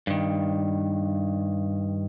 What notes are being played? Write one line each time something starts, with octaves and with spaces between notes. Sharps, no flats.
G2 D#3